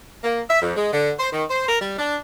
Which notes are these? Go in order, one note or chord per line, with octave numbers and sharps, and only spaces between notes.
A#3
E5
F2
G#3
D3
C5
D#3
C5
A#4
G3
D4